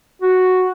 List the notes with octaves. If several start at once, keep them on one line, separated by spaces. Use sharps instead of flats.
F#4